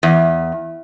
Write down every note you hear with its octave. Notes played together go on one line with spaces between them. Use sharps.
E2